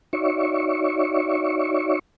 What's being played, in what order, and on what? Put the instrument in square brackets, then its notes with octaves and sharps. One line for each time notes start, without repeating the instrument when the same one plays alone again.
[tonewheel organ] D#4 F#4 C#5 D5 E5 C#6